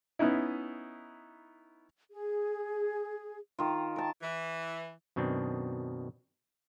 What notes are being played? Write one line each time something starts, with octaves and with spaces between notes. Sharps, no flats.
B3 C#4 D#4 E4
G#4
D#3 F4
A#4 G5 A5 A#5
E3
F#2 B2 D#3 C4 D4